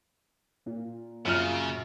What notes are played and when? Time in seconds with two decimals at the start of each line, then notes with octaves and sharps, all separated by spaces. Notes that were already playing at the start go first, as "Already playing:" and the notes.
0.66 A#2
1.25 F#2 C#3 F4 F6